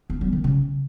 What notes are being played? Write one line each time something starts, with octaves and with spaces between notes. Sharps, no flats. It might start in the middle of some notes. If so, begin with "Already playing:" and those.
B3
F#3
D#3
C#3